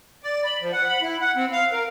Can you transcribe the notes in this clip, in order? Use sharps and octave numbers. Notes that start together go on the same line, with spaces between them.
D5
B5
F3
F#5
B5
E4
F#5
C4
F5
A#4